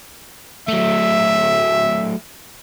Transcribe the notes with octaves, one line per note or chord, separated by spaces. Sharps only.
F#3 A3 E5